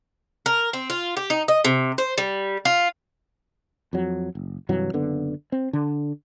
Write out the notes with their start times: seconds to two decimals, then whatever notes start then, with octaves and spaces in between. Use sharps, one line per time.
0.46 A#4
0.73 C4
0.90 F4
1.17 G4
1.30 D#4
1.48 D#5
1.64 C3
1.98 C5
2.18 G3
2.65 F4
3.93 F2 F#3
4.35 F#1
4.69 G2 C3 E3 F#3
4.93 F#1 D3 B3
5.52 C4
5.73 D3